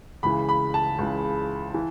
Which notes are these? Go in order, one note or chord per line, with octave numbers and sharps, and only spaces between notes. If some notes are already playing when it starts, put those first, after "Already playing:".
C#2 C#3 E3 B5
B5
A5
C#2 C#3 E3
E3